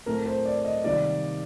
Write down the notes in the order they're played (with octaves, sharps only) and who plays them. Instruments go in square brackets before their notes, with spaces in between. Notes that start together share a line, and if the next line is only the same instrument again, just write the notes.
[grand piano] A2 A3 C4 A#4
C5
D5
D#5
C3 D#3 G3 A#3 D5